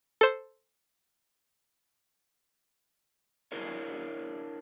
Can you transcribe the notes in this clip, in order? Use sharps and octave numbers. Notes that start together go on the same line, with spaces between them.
A4 C5
D4 E4 G#4 A#4 C#5